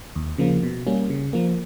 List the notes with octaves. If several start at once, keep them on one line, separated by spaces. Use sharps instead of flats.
D#2
C#3 F3 A#3
B2
G3 A#3 C#4
C#3
F3 A#3